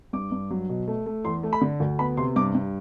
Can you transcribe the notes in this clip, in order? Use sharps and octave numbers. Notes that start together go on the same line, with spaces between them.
G2 D6
G2
F#3
B2
A3
A3
E2 C6
A3
B5
D3
D2
B3 B5
C3 C6
G2 D6
G2